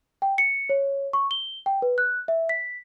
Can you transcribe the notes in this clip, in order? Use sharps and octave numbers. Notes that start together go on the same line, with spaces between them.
G5
C#7
C#5
C#6
G7
G5
B4
F#6
E5
B6